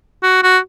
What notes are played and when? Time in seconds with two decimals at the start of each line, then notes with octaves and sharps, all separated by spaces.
0.23 F#4
0.43 F#4